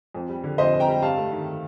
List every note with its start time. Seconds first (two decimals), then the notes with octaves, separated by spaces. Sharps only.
0.15 F2
0.29 G3
0.44 D3
0.58 F2 C5 D#5
0.73 F2
0.80 G5 A#5
0.89 G3
1.02 G2 F5 A5
1.17 A3
1.32 D#3